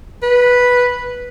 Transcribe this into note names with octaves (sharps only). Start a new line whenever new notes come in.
B4